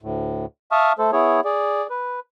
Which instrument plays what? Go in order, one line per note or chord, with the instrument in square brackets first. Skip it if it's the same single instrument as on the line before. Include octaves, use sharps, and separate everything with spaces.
[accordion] D2 A2
E5 F5 A5 C#6 D#6 F6
A3 A4 C5
B3 E4 G#4 C#5
G#4 D5
B4